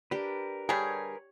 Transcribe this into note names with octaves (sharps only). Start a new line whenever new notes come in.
D4 G4 A#4 B4
D3 G3 G#4 A#4 B4 C#5 G6